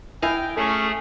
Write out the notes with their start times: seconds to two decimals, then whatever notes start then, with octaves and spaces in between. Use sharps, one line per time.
0.23 E4 D#5 F5 G5 G#5
0.56 A3 C#4 G#4 A4